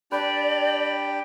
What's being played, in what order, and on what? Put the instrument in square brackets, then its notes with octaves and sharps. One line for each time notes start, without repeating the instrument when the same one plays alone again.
[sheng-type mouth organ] D4 G4 G5 [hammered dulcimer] B4 [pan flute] D5